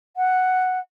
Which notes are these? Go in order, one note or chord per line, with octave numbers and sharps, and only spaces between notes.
F#5